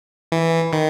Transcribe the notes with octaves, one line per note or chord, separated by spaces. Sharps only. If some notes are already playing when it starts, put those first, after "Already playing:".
E3
D#3